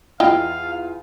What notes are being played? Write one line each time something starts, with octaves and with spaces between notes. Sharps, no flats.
E2 E4 F4 D#5 F5 G5